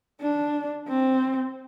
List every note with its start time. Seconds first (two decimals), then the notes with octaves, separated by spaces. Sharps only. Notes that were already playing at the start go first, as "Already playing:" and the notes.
0.21 D4
0.89 C4